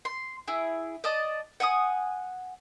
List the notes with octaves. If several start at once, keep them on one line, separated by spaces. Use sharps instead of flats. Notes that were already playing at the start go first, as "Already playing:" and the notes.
C6
E4 G#4
D5 D#5 A5 D#6
F#5 G#5 C#6 D#6